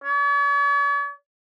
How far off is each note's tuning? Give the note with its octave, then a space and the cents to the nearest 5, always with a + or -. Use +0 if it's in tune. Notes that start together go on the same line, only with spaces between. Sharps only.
C#5 +45